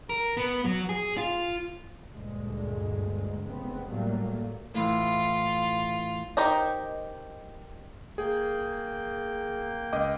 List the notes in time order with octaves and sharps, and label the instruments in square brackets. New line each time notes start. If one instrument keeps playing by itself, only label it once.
[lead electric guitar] A#4
B3
F#3
G#4
F4
[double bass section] D2 G2 A#2 G#3
F1 C#2 C#3 B3 C4
A2 F#3 G3 A3 A#3
[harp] A2 E3 [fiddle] F4
[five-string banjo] D#4 G4 A#4 C5 D#5
[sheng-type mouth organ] A#3 G5 [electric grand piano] G#4
[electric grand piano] C#2 D#5 D6